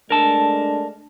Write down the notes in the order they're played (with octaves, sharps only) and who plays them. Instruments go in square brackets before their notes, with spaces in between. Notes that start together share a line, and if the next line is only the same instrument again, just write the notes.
[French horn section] G#3 A3 D4 [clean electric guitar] A#4 A5